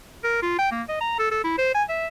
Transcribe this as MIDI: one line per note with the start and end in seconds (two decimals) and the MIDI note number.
0.24 0.39 70
0.42 0.54 65
0.58 0.71 79
0.71 0.82 58
0.89 0.97 75
1.01 1.15 82
1.19 1.29 69
1.31 1.40 69
1.44 1.54 64
1.58 1.70 72
1.74 1.83 80
1.89 2.07 76